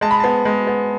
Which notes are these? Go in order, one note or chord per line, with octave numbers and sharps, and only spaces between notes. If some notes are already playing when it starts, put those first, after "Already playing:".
G#3 A5
B5
B3 A5
G#3
B3